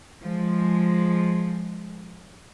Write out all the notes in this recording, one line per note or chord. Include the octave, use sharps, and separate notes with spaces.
F3 G#3